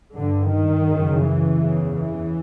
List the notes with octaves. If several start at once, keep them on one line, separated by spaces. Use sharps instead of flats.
G2 D3
D#3
F#2 C#3
E3
E2 C#3
E3